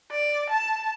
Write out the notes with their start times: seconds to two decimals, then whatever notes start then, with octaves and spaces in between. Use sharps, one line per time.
0.11 D5
0.50 A5